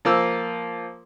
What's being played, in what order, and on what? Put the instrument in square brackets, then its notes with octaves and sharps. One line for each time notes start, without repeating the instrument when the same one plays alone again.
[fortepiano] F3 A#3 E6